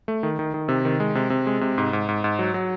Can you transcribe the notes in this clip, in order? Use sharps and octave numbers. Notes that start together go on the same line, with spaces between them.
A3
D#3
D#3
D#3
C3
D#3
G#3
C3
C3
G#3
C3
G#2
G#2
G#2
G#2
F#3
F#3